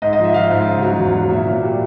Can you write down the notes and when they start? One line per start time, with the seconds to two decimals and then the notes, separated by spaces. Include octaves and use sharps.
0.02 G#2 D#5
0.13 D#5
0.19 F3 E5
0.34 F3 F5
0.51 G#2
0.66 C#3
0.82 F#3
0.98 E2
1.14 F#3
1.30 A#2 E5
1.47 A#2
1.63 G3